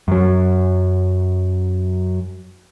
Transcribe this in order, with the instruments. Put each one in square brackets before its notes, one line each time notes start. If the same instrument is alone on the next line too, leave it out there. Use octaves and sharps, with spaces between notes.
[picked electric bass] F#2 F#3